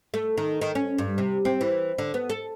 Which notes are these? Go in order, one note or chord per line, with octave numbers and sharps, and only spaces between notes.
A3
D#3
D#3
C#4
G2
C3
C4
E3
D3
B3
A4